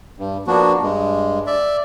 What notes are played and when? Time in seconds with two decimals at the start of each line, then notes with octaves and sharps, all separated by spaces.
0.18 G2
0.47 F3 A#3 B3 D4 F#4
0.82 G2 G#3
1.47 D5 E5